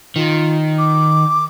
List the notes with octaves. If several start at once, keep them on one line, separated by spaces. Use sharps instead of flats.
D#3 F4
D6